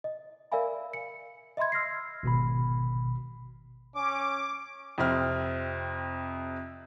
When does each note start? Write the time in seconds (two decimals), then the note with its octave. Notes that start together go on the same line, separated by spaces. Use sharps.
0.04 D#5
0.52 A#4 D5 E5 F5 G#5 B5
0.93 C#7
1.57 D#5 E5 B5 C6 G#6
1.72 E6 F6 A#6 C7
2.23 G#1 B2 B5
3.95 C#4 D6
4.98 F2 C3 C4 F6